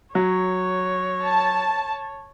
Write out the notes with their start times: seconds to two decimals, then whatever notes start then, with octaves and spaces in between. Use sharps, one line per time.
0.15 F#3 C#5
1.23 A5